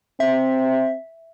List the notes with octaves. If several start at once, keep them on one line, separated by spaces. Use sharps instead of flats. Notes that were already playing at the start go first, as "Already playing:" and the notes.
C4 E5